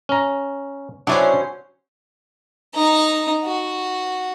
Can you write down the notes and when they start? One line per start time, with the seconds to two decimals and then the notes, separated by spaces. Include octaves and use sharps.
0.09 C#4 A#5
1.07 F#3 C#4 D4 E4 C5 D5
2.74 D#4 A#5
3.44 F#4